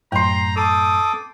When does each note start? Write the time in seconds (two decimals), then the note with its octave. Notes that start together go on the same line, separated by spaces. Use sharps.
0.12 F#2 A2 G5 A#5 C6
0.56 A4 D6 D#6